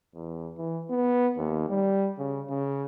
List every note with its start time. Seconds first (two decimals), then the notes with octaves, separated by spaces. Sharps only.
0.15 E2
0.58 E3
0.90 B3
1.37 D#2
1.70 G3
2.19 C#3
2.50 C#3